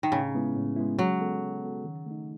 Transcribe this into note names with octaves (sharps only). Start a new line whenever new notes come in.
D#3
A2 C#3
G#3 B3 E4
A2
G#3 B3 E4
F#3 G#3
B3 F#4 A4
G#3
B3 F#4 A4
D#3
A3 D#4